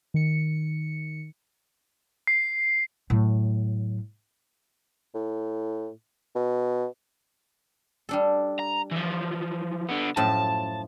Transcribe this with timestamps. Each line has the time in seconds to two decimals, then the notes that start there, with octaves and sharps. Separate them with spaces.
0.14 D#3 C#7
2.27 C7
3.10 A2 F#3
5.15 A2
6.35 B2
8.09 G3 D4 A4
8.59 A#5
8.91 E3 F3
9.89 D3 B3
10.17 F#2 A2 F3 A5